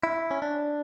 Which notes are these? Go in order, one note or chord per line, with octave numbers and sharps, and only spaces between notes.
E4
C#4
D4